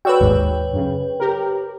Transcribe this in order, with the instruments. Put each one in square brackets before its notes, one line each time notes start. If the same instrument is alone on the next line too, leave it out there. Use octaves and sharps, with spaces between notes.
[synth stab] F#4 D5 E6 [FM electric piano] B4 C#5 G5
[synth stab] G#1 D#2 G#2
F#2 C#3
G4 A#4